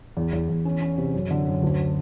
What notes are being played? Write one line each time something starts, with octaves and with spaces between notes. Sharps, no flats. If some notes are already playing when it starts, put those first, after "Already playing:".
E2
E2
E2
C#4
C#4
C3
F#2
D3
F#2
D2